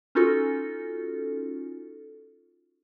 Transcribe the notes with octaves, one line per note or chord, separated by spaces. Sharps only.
C#4 D#4 F4 F#4 A4